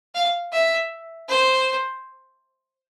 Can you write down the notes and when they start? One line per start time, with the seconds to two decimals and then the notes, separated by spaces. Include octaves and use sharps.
0.15 F5
0.52 E5
1.29 C5